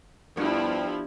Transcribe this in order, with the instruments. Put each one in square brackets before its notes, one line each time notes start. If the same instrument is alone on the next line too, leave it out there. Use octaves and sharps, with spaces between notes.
[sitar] G2 [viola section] F3 B3 E4